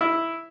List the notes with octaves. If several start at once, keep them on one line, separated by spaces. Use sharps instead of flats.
E4